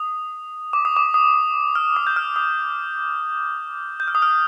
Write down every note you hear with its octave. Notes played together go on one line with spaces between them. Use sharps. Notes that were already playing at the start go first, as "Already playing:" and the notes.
Already playing: D#6
D6
D#6
D6
D#6
F6
D#6
G6
F6
D#6
G6
F6
D#6
F6